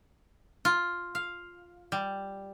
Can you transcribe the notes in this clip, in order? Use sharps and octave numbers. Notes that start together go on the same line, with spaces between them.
F4
F5
G3